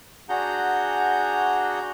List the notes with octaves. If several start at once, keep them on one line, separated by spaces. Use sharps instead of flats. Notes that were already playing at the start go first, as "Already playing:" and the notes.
D4 F#4 G#4 F#5 A#5 G6